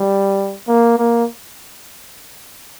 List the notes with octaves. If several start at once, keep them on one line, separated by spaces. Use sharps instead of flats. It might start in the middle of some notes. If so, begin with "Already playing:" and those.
Already playing: G3
A#3
A#3